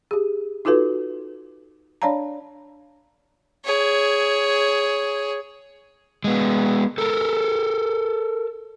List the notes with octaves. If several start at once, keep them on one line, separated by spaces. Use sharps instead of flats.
G4 G#4
D#4 F4 F#4 A4 B4
D4 C#5 D5 F5 A5 A#5
G#4 C#5
G#3 B3
A4 A#4